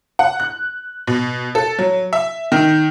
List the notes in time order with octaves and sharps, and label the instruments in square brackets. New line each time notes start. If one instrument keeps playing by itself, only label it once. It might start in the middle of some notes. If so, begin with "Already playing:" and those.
[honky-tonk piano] F#5
F#6
B2
A4
F#3
E5
D#3